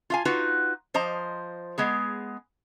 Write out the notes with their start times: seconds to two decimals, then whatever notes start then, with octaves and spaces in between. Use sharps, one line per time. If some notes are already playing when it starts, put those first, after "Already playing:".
0.10 F4 F5 G#5
0.25 D#4 F4 F#4 B4
0.94 F3 C5 D#5 A#5
1.78 G#3 B3 G#4